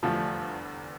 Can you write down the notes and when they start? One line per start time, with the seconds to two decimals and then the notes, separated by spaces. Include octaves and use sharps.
0.03 F1 E2 D3 F3 G3 A3